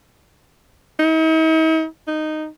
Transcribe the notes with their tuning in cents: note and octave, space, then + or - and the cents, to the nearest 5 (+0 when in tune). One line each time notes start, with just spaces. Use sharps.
D#4 +45
D#4 -10